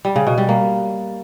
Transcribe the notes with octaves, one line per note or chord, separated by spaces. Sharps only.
G3
C#3
B2
G3
A#3